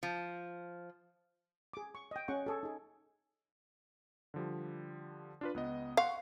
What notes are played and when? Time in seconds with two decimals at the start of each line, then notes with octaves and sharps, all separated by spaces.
0.03 F3
1.73 G#4 D6
1.95 C#6
2.11 D#5 G5
2.28 C#4 G#4 F#5 C#6
2.46 G#4 A4 C#6
2.63 D#4 G#4
4.34 D3 F3 G3
5.41 D4 F4 B4
5.54 C#2 B3 D#5
5.97 F5 F#5 C6 C#6